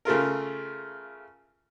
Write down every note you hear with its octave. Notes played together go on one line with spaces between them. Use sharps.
C#3 A3 F4 A#4